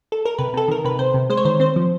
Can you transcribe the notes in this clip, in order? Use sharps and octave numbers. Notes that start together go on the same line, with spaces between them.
A4
A#4
C3 B4
C3 A4
D#3 A#4
C3 B4
C3 C5
C3
G#3 C5
C#5
D#3 C5
C4 C5
F3